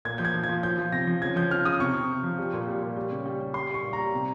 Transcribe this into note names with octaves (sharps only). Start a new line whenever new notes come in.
A#2 G#6
F3 G6
G#6
F3
G#6
F3
F3 G6
F3
C3 A#6
F3
C#3 G#6
F3 G6
C#3 F6
C#3 D#6
C3 C#6
C3
C3
F3
G3
A#2
G3
A#2
G3
C#3
G3
G3
G3 C6
G3 C#6
A#2
A#5
G3
C3